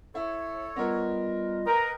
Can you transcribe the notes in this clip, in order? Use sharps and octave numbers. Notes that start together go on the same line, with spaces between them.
E4 A4 C#5
G3 B3 F4 A#4 D#5
A#4 B4 D#5 G5